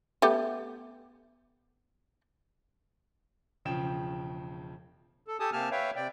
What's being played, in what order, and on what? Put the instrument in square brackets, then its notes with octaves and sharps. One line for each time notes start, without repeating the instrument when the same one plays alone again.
[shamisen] A3 B3 G4
[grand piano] E1 C#3 F3 G5 E7
[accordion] A4
G4 A4 G#5 A5 D#6
C3 A#3 G4 G#5 A5 F6
B4 C#5 E5 F5 G5
C3 D5 G5